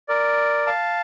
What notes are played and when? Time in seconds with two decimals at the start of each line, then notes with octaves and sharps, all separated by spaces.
0.08 A#4 D5
0.66 F5 A5